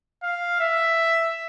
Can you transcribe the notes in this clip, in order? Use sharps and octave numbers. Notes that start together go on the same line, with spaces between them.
F5
E5